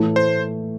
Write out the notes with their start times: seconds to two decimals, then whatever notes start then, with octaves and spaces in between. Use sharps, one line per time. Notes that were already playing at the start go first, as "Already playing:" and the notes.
Already playing: A2 E3 A3 E4
0.16 C5